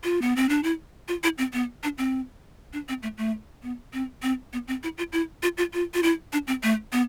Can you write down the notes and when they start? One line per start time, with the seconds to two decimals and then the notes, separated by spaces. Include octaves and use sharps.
0.03 F4
0.22 B3
0.36 C4
0.49 D4
0.63 E4
1.08 F4
1.23 E4
1.38 C4
1.53 B3
1.83 D4
1.98 C4
2.73 D4
2.89 C4
3.03 A3
3.18 A3
3.63 B3
3.93 C4
4.23 C4
4.53 B3
4.68 C4
4.83 E4
4.98 F4
5.12 E4
5.43 F4
5.57 F4
5.73 F4
5.94 F4
6.03 E4
6.33 D4
6.47 C4
6.63 A3
6.93 B3